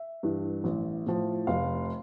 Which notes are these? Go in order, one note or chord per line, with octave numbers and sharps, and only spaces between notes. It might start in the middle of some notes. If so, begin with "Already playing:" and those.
Already playing: E5
G2 E3
A1
A2 F3
F1 F5